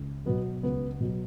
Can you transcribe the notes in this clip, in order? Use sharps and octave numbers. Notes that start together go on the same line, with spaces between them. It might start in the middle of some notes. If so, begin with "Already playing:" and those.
Already playing: C#2
B2 F#3 B3
C#2 B3
B2 F#3